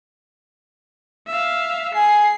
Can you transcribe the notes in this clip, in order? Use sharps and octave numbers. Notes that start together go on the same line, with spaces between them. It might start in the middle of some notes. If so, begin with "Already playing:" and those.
E5 F5
G#4 C7